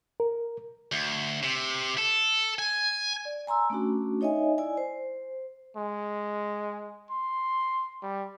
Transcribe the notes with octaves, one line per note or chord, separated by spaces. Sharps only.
A#4
D2
C3
A4
G#5
D5
G#5 A#5 C6 E6
A3 C#4 D4 F#4
D#4 C#5 D#5 E5 G#5
E4 D5 G#5
C5
G#3
C6
G3